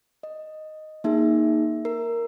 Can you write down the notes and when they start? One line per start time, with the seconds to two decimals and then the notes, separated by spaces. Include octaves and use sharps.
0.23 D#5
1.04 A#3 D#4 G#4 E5
1.85 A#4